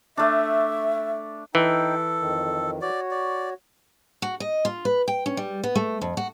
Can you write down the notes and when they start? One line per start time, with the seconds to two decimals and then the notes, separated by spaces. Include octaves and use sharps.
0.17 A3 D4 E5
1.55 E3 D#4 A4 G5
2.21 F2 D#3
2.81 F#4 C#5 D5
3.11 D5
4.22 F#4
4.40 D#5
4.65 F4
4.85 B4
5.08 G5
5.26 C#4
5.37 G3
5.63 B3
5.75 A3
6.01 F2
6.17 F#4